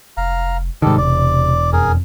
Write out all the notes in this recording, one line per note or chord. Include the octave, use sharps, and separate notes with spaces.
F1 F5 A#5
G#2 C3 D#3 G3 A4
E1 D5
F2 G#4 A#4